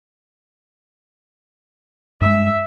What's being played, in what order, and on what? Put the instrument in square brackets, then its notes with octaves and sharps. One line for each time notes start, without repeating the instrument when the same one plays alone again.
[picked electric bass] G2 G#3 [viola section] E5